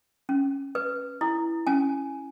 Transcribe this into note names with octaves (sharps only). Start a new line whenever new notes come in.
C#4
B4
E4
C#4 G#5